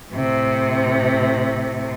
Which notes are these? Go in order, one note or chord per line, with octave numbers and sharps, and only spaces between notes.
A2 C3